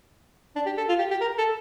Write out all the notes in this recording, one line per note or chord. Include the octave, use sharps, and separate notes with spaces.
D4
G4
A4
F4
G4
G4
A#4
A4